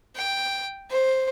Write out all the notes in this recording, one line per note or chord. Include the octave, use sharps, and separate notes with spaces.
G5
C5